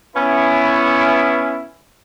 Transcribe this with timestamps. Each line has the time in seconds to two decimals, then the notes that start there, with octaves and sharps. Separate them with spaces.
0.16 B3 C#4 E4